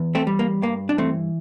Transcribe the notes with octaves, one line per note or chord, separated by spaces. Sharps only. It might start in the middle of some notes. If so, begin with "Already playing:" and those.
Already playing: E2
A3 C4
G3
A#3
G2 A#3
D4
E3 A3 C4